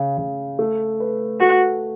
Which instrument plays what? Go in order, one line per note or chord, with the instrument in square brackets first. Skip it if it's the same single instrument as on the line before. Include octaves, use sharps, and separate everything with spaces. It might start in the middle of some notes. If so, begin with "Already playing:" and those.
Already playing: [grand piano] C#3
C#3
A3
B4
[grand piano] A3 [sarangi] F#4